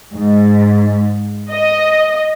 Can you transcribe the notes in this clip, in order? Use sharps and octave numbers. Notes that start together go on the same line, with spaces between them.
G#2
D#5